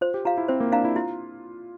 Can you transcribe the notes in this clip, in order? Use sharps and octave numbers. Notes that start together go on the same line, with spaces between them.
F4 C5
G4
F4 F5 A#5
E4
C4 C5
A#3
D4 F5 A#5
E4
E4 F4